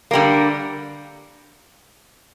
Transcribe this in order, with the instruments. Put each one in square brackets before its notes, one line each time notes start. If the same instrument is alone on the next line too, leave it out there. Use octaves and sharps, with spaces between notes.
[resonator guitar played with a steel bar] D3 G3 A#3